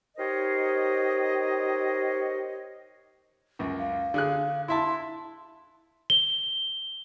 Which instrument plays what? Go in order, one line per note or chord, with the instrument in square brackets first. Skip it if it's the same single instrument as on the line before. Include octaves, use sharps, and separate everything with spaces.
[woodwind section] D#4 G4 A#4 C5 C#5 D#5
[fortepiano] C#2 F#2
[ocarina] F5
[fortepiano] D3 G#4 F#6
[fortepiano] E4 E5 A5 [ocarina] C6
[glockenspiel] G7